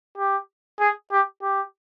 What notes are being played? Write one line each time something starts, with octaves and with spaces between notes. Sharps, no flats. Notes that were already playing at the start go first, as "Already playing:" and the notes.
G4
G#4
G4
G4